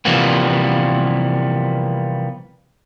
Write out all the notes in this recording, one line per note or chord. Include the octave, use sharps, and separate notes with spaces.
C3 E3 F3 G3 A#3 B3